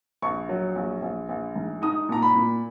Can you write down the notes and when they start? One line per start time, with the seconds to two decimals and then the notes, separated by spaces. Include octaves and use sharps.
0.22 A#1 C#6
0.49 F#3
0.76 A#1
1.02 A#1
1.29 A#1
1.56 G#2
1.82 D#4 D#6
2.09 A#2 A#5
2.22 B5
2.35 A#2